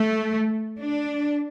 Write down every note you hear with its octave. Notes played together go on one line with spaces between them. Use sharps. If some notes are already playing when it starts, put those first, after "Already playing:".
Already playing: A3
D4